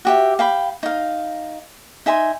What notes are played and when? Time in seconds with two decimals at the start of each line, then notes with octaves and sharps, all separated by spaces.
0.05 F#4 G4 E5
0.39 F5 G5 B5
0.83 D#4 F5
2.06 D#4 E5 G#5 C6